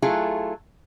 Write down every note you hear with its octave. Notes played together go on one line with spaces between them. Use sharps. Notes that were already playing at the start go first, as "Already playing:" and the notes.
F#3 A3 E4 F4 G#4 A4